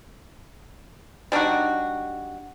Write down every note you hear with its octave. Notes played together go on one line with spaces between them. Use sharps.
G3 D4 D#4 F#4